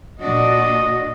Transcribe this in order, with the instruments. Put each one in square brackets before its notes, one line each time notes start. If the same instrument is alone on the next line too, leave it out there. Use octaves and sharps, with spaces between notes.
[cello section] A#2 D4 F#4 [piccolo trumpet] D#5